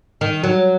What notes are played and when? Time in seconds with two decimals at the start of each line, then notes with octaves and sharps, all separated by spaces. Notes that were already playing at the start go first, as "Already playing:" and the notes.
0.21 D#3
0.44 F#3